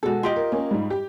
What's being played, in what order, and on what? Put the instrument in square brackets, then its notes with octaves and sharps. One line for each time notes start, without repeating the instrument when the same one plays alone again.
[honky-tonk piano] B2 G#3 [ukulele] F#4 A4
[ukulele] F4 G4 D#5
[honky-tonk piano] A#4
A#3 C#4
G#2 G3
G4